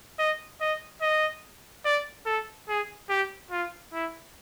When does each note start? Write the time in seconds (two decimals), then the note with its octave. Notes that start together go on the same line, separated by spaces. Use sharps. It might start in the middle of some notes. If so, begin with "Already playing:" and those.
0.19 D#5
0.61 D#5
1.01 D#5
1.85 D5
2.26 A4
2.69 G#4
3.09 G4
3.51 F4
3.93 E4